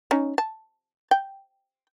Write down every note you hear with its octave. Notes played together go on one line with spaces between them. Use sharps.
C#4 D#4
A5
G5